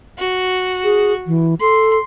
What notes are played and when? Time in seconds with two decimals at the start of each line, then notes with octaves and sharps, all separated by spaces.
0.18 F#4
0.84 G#4
1.27 E3
1.61 A4 C6